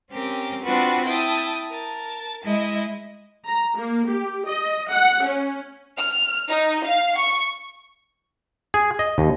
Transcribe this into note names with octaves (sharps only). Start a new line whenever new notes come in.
C4 C#4 G4 A#4
C4 D4 F4 F#4 B4
E4 G5 A5 D#6
A#4 A5
G#3 E4 D#5
A#5
A#3
G4
D#5
F#5
C#4
F6
D#4
F5
C#6
G#4
D#5
D#2